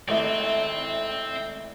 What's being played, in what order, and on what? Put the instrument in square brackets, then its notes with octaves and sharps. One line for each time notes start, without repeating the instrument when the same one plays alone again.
[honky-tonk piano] G#1 A3 E4 [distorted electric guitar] C4